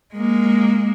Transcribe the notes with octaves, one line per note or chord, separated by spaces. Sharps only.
G#3 A#3